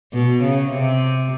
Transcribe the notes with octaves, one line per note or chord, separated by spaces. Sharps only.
B2
C#3
C3